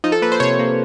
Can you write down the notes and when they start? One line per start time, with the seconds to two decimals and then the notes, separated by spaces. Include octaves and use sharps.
0.04 F3 D#4
0.12 A4
0.22 A#3 B4
0.32 C5
0.40 C3 C#5
0.59 A#3